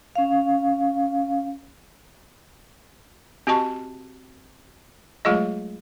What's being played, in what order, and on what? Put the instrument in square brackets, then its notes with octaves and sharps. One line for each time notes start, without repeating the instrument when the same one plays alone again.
[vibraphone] C#4 F5
[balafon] C4 F#4 G4 D#5 A5 C#6
F#3 G#3 A3 F4 G#4 D#5